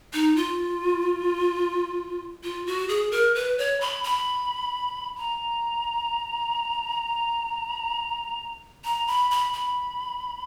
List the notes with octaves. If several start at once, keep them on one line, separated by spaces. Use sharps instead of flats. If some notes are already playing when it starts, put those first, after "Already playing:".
D#4
F4
F4
F#4
G#4
A#4
B4
C#5
B5
B5
A#5
A#5
B5
B5
B5